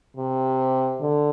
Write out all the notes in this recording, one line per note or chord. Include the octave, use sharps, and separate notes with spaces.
C3
D3